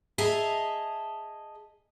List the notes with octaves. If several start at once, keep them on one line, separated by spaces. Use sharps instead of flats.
G#4 D#5 E5 A5 A#5